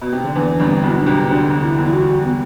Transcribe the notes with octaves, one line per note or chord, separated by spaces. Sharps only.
B2
C3
D3
E2 E3 D4
G1 G2
C4
B1 B2 E4
D4
C2 C3
D2 D3 D4
E4
E2
E4
F#4
B3